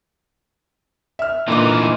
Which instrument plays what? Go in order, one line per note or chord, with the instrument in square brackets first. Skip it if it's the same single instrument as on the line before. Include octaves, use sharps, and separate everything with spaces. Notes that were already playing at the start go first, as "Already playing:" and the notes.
[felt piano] E5 F6
[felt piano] A#2 D3 D6 [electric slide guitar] E3 D#4